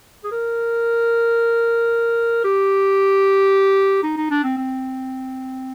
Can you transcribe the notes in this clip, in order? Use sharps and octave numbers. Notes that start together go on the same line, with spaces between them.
G#4
A#4
G4
D#4
D#4
D4
C4
C4